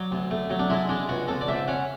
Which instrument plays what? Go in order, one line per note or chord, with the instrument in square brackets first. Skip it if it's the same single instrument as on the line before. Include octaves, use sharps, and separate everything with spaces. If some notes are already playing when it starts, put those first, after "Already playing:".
Already playing: [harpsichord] F#3 D5
D2
A3
F#3
D4
G#3 E4
G#3 D4
C#2 F#4
C#2 A4
D5
G#2 E5
C#4 F#5